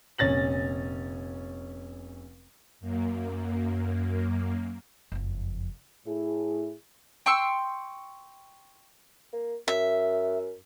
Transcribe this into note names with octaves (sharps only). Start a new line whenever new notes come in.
F1 A#2 C#4 A6 A#6 F#7
F#2 A#3
F#1 F2
A2 E4 G#4
G5 C6 C#6 E6
A#3
F#2 E5